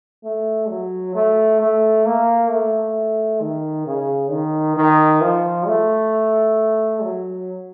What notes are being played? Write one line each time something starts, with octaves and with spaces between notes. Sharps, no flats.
A3
F#3
A3
A3
A#3
A3
D#3
C#3
D#3
D#3
F3
A3
F#3